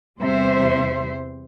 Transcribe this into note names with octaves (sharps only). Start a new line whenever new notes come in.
E2 C3 G3 C5 E5